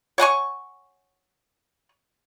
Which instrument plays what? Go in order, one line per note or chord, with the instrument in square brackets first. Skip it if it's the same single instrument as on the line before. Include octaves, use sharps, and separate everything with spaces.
[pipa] C#5 F#5 G#5 C#6